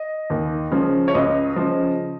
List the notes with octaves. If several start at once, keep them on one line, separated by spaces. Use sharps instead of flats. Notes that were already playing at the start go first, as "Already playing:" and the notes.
Already playing: D#5
D#2
C#3 F3
C#5
C#2 D#5
C#3 F3